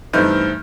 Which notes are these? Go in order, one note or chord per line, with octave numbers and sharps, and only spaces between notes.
G2 E3 A3 C4 D#4 F6 G6